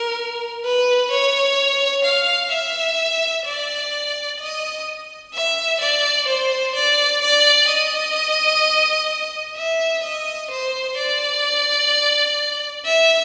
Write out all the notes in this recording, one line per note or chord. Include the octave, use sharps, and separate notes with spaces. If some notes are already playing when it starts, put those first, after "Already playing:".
Already playing: A#4
B4
C#5
F5
E5
D5
D#5
E5
D5
C5
D5
D5
D#5
E5
D#5
C5
D5
E5